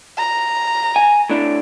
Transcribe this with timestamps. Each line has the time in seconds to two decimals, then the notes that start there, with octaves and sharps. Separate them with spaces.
0.18 A#5
0.96 G#5
1.30 A2 D4